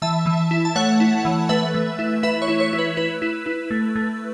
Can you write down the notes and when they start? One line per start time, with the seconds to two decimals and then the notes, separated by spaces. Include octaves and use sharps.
0.02 E3 E5 A5
0.26 E3
0.51 E4
0.65 A5
0.76 A3 C#5 F#5
1.00 E4
1.25 E3
1.49 A3 B4 E5
1.74 A3
1.99 E4
2.23 E4 B4 E5
2.42 C#5
2.48 E4
2.60 C#5
2.73 E4
2.79 B4
2.97 E4 B4
3.22 E4
3.46 E4
3.71 A3
3.96 A3